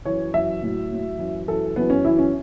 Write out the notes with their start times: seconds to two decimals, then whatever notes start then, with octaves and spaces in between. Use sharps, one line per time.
0.05 F#2 E3 C#5
0.34 F#2 E3 E5
0.63 A2 F#3
0.91 A2 F#3
1.19 F#2 E3
1.48 F#2 E3 A4
1.76 F#2 E3 B3
1.90 C#4
2.04 F#2 E3 E4
2.19 C#4